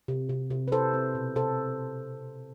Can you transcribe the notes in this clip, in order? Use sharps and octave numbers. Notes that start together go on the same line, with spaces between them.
C3
C3
C3
B4
E4 A4 C5
C4
B2
C3 A4 C5